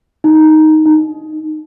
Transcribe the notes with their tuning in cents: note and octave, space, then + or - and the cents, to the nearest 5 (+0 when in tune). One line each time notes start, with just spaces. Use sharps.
D#4 +5
D#4 -10